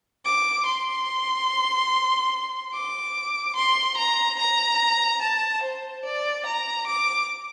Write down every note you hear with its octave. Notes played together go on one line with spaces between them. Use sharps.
D6
C6
D6
C6
A#5
A#5
A5
C5
D5
A#5
D6